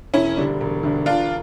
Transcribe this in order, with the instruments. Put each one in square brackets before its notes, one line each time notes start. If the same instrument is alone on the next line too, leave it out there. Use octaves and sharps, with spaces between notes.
[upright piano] E1 [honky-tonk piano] C#4 E4
[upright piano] D2 D3 G3 D4
E1
D2 D3 G3 D4
[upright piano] E1 [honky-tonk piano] D4 F4